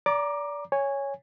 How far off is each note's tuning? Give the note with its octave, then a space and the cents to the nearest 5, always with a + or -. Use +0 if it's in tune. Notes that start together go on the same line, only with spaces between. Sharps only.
D5 -25 A#5 +15 D6 +15
C#5 +0 G#5 -15